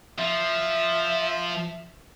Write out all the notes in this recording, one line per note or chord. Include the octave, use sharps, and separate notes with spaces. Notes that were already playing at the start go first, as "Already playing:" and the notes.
F3 E5